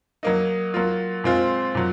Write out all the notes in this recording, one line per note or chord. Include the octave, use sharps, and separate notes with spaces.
F#3 A#3 D#4
F#3 A#3 F4
A#2 G#3 C4 F4
A#2 F#3